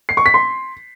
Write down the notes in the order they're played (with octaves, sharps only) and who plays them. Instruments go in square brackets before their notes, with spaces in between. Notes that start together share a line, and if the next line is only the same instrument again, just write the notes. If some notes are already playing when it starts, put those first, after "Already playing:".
[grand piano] C7
C#6
B6
C6